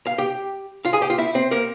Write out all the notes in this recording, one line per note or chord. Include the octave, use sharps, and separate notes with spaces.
F5
G4 G5
F4 F5
G#4 G#5
G4 G5
F4 F5
E4 E5
C4 C5
A#3 A#4